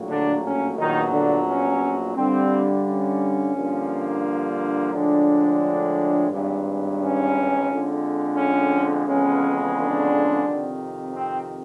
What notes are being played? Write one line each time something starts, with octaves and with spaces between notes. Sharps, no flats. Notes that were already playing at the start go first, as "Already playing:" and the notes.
Already playing: A#1 A2 F#3 A#3
D3 D4
C#4
A#1 A#2 D#3 F#3 B3 D#4
D3 D4
C#4
G2 D3 G3 C4
C#4
G2 D3 F3 A#3
A2 D3 F3 G#3 D4
G#1 G2 E3
C#4
F2 D3 F3 G#3
C#4
F2 C#3 E3 G#3 B3 C#4
D3 D4
F2 C3 D#3
C4